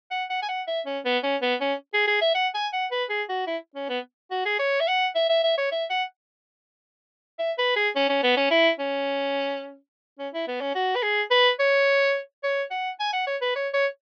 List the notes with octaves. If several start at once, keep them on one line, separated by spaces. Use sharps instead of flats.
F#5
F#5
G#5
F#5
E5
C#4
B3
C#4
B3
C#4
G#4
G#4
E5
F#5
G#5
F#5
B4
G#4
F#4
E4
C#4
B3
F#4
G#4
C#5
E5
F#5
E5
E5
E5
C#5
E5
F#5
E5
B4
G#4
C#4
C#4
B3
C#4
E4
C#4
C#4
E4
B3
C#4
F#4
B4
G#4
B4
C#5
C#5
F#5
G#5
F#5
C#5
B4
C#5
C#5